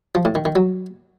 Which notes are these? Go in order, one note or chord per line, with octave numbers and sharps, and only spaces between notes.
F3
A2
D#3
D#3
F#3